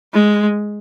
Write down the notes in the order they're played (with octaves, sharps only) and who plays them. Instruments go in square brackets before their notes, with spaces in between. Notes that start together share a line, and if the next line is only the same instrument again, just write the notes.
[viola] G#3